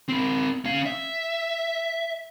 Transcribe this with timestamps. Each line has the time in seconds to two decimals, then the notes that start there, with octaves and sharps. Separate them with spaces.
0.08 C4 A#4
0.65 C#4 F5
0.86 E5